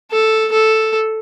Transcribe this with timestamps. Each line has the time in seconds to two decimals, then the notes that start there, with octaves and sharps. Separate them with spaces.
0.11 A4
0.52 A4